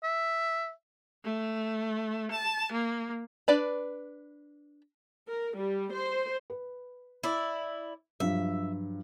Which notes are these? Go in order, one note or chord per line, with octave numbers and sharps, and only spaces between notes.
E5
A3
A5
A#3
D4 B4 D5 B5
A#4
G3
C5
B4
E4 D5
G2 F3 F#3 E5